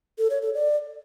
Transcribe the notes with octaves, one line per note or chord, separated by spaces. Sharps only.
A4
C#5
A4
D5